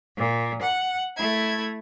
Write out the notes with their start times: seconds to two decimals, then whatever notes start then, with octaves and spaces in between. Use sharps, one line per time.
0.17 A#2
0.61 F#5
1.16 A3 E4 G#6